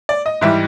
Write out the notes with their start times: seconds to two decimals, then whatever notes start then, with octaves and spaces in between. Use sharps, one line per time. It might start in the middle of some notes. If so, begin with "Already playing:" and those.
0.09 D5
0.26 D#5
0.41 G#2 E3 G3 E5